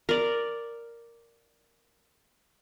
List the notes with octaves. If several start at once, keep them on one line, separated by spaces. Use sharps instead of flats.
A#4 D5